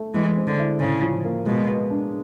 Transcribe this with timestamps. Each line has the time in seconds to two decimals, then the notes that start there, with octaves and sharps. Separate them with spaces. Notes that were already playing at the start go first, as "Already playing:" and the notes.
Already playing: A3
0.14 E3 G#3
0.37 C4
0.47 D3
0.59 E4
0.80 A2 C#3
1.02 F3
1.25 A#3
1.46 B2 G#3
1.68 B3
1.90 D4